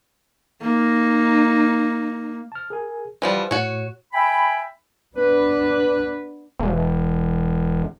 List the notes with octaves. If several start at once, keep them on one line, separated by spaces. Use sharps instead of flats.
A#3 D#4
A5 F6
G#4 A#4 G#5
E3 F3 G3 B4 C5 F#5
A2 F#4 C#5
E5 G5 G#5 B5
B3 D4 B4
E1